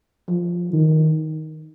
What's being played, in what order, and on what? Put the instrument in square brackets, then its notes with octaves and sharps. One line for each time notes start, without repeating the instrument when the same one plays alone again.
[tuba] F3
D#3